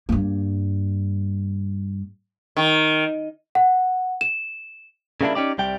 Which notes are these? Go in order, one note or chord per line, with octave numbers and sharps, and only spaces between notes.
G2 A#3
D#3
F#5
E7
C#3 G3 A#3 C#4 D4 E4
C#4 D#4 G4 D5
C2 G3 G5